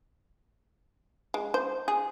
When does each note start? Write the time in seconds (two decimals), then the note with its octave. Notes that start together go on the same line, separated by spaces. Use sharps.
1.34 G#3
1.54 C5
1.88 G#4